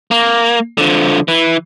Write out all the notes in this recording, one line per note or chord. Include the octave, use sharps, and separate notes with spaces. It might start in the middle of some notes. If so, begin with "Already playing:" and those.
A#3
D3 F3
E3